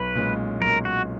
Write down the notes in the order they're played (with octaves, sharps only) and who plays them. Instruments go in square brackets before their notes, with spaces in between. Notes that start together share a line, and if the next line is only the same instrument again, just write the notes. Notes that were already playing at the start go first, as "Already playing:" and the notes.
Already playing: [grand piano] B1 [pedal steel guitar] B4
[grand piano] A#2 G#3 C#4
[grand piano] B1 [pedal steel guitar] A#4
[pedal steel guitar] F#4